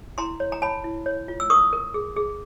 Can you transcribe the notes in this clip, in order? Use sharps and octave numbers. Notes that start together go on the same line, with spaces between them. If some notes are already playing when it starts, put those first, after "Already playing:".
E4 A#5 C6
C#5
A#5
C#5 A5 B5
E4
C#5
F4
E6
A#4 C#6 D#6
A#4
G#4
G#4